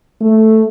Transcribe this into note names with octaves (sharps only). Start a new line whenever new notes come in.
A3